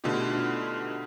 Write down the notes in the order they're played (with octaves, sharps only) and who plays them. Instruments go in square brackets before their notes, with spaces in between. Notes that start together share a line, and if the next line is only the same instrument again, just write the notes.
[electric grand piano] B2 D3 A3 D#4 F4 G4